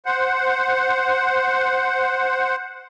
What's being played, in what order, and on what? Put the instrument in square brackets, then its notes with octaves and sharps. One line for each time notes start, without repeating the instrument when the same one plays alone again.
[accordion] C5 F#5